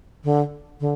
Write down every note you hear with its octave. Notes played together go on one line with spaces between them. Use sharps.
D3
D3